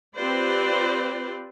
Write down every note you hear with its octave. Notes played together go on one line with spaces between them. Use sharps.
C4 F4 G4 B4 C5 D5